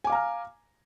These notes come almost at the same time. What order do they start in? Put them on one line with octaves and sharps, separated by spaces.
G#5 D6 F5 A#5 F6